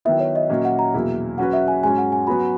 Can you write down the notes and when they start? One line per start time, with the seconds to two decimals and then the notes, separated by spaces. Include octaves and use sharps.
0.05 D#3 F#3 B3 E4 E5
0.20 C#5
0.36 D#5
0.50 A#2 F#3 A#3 C#4
0.65 F#5
0.79 A#5
0.94 E2 B2 F#3 A#3 E4
1.38 F#3 C#4 F#4 B4 F#5
1.53 E5
1.68 G#5
1.83 G#2 F#3 C#4 G#5
1.98 F#5
2.12 G#5
2.27 F#3 B3 F#4 B5